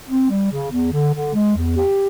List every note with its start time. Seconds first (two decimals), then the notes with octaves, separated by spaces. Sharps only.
0.08 C4
0.29 G3
0.51 C#3
0.71 E2
0.92 D3
1.14 D3
1.34 G#3
1.56 E2
1.77 G4